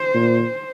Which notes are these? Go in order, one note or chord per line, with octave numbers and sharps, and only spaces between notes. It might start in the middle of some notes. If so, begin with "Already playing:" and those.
Already playing: C5
A#2